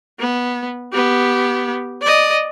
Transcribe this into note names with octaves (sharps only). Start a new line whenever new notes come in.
B3
B3 G4
D5 D#5